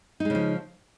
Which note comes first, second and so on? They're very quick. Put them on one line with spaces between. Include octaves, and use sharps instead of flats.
D#4 G#3 C#3 F3